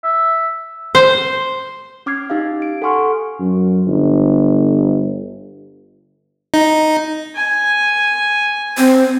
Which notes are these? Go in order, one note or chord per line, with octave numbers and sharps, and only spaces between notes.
E5
C5
C#4 D6 F6 G#6 C7
D#4 G4 F5
D7
A4 F#5 G#5 C6 C#6 F6
F#2
G1
D#4
G#5
C4